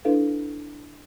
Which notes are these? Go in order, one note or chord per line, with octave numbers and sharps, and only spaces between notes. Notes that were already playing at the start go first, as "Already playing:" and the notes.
D4 E4 A4 B4 F5